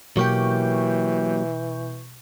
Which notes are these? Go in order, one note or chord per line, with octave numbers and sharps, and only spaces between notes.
B2 E3 F#3 A#3 G4 C#6 G6